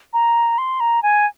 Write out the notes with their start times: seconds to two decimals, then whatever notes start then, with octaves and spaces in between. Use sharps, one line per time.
0.13 A#5
0.58 C6
0.80 A#5
1.03 G#5